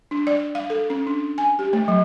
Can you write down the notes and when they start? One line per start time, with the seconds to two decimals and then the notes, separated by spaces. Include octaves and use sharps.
0.11 D4
0.27 D5
0.55 F5
0.70 A4
0.90 C#4
1.07 D4
1.38 G#5
1.59 G4
1.73 A3
1.88 F#3